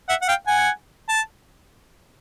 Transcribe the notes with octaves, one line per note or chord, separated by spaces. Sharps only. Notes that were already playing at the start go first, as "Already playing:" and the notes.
E5 F#5
F#5
F5 G5
F#5 G#5
A5